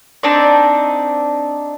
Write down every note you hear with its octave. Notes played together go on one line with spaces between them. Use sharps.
C4 D4 D#4 D5